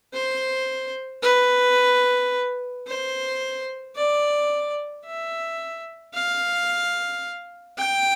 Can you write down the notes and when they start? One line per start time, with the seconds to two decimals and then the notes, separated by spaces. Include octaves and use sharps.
0.14 C5
1.23 B4
2.87 C5
3.96 D5
5.05 E5
6.14 F5
7.78 G5